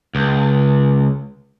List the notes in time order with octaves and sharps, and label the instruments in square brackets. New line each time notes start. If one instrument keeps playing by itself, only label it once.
[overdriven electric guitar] C#2